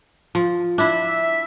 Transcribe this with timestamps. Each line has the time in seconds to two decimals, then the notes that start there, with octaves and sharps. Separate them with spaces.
0.35 F3
0.78 D4 E4 E5